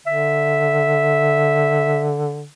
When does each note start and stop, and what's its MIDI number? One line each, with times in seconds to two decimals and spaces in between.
0.07 2.46 50
0.07 2.09 76